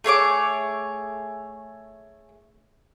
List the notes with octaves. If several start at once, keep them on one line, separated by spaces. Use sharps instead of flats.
A3 G#4 C#5 D6